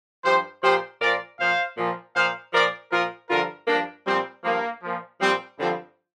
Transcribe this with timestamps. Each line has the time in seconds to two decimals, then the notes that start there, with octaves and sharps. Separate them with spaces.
0.25 G2 F3 G4 C5
0.63 A#2 F3 G4 C5
1.01 A#2 F3 A#4 D5
1.39 A#2 F3 C5 F5
1.77 A#2 F3
2.15 A#2 F3 C5 F5
2.54 A#2 F3 A#4 D5
2.91 A#2 F3 F4 A#4
3.29 G2 D3 F3 F4 A#4
3.68 G2 F3 A#3 D4
4.06 A#2 F3 G3 C4
4.44 G2 F3 A#3
4.82 A#2 F3
5.20 A#2 F3 G3 C4
5.59 G2 D3 F3 G3 C4